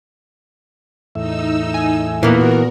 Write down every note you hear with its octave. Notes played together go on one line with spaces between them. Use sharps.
E2 A2 D#4 E5 E6
G#5
A#2 E3 A#3 B3 F#4 A#4